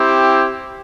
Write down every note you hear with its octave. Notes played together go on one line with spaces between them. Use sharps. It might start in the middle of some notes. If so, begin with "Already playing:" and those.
Already playing: C4 E4 G4